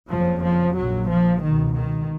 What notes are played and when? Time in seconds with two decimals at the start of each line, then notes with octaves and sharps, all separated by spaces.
0.11 F#1 F2 C#3 F3
0.44 F3
0.76 A#1 A#2 F#3
1.10 F3
1.43 C#2 B2 D#3
1.75 D#3